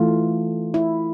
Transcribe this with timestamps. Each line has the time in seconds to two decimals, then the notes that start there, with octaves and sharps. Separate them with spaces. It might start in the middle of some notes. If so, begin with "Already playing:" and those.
Already playing: E3 A3 F4
0.74 E4